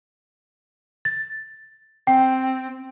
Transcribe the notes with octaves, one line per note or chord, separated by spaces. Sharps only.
A6
C4 G5